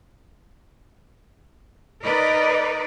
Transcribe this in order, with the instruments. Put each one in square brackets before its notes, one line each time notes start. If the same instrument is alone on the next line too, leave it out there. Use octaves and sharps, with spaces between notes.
[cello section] D#4 A#4 B4 D5 D#5